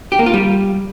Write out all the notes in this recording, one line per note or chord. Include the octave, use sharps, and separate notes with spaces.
G4
A#3
F4
G3